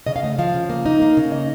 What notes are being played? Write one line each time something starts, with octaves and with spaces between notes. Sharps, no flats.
C#3 D#5
F5
A3 D#5
F3 F5
C#3
A#3
D#4
A#3
C#3
D#5